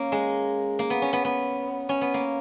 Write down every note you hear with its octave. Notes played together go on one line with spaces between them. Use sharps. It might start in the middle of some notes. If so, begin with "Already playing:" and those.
Already playing: A#3 C#4
G#3
A#3
B3
C#4
B3
B3
C#4
B3
A#3